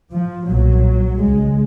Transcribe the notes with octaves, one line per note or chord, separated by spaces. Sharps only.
F3
B1 A#2 F#3
C#2 C#3 G#3